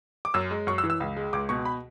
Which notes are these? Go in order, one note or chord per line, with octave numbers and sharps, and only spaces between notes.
D6
F#2 E6
G#3
F#2 C#6
E6
E3
E6
C#2
G#3
C#2 D6
B2 C#6
B5